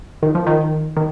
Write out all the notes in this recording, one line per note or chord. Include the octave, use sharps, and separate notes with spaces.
D#3
F3
D#3
D#3